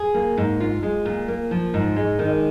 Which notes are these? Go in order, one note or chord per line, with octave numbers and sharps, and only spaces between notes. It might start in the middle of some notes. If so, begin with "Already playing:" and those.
Already playing: G#4
A#3
G#2
F4
G#3
A#2
A#3
F3
G#2
G#3
D#3